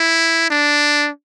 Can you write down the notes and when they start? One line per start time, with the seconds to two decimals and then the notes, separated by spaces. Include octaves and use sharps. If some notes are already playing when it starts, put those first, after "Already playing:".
Already playing: E4
0.50 D4